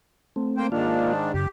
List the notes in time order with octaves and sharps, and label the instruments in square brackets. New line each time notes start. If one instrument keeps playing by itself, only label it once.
[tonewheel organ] A3 C4
[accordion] A#3 C5 G5
[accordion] G#2 D#3 D4 [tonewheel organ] A#3 F4 F5
[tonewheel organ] F#2 C#3 [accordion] G4